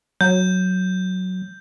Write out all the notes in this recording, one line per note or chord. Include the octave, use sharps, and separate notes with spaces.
F#3 G6